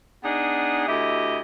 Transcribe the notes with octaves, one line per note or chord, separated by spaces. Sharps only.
B3 D4 D#4 G#4
D2 E4 G4 D#5